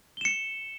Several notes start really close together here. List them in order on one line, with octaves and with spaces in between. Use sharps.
G7 E7 C#7